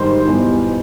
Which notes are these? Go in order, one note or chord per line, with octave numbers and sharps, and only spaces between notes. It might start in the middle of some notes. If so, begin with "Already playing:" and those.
Already playing: G#2 D#3 G3 C5 C6
E2 B2 G3